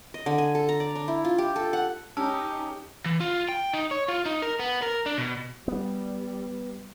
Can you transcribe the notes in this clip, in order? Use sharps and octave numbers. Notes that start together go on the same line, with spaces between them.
D#5
D3
G#5
A4
A#5
D5
D4
E4
F4
G4
A4
F#5
C#4 D#4 G4 A5 E6 F6
E3
F4
G5
D#4
C#5
F4
D#4
A#4
B3
A#4
D4
B2
G3 B3